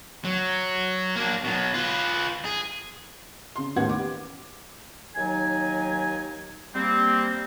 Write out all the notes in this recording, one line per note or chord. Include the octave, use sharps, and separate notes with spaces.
F#3
A#3 D4
B2 F#3
F4 B4
G#4
C#3 C6
A1 D#2 B3 G4 F#5 G#6
D6
D#2 F#3 D#4 G#5
G3 A#3 C4